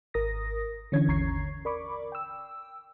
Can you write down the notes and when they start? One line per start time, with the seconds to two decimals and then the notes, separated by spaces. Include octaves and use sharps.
0.14 G#1 A#4 D#6 A#6
0.92 D3 E3 C#4 C#5 G#6
1.08 G#1 D#2 A#5 C#6 G#6 C7
1.65 A#4 D5 B5 C#6 D6
2.12 G5 E6